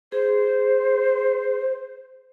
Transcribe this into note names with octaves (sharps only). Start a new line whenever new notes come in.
G#4 C5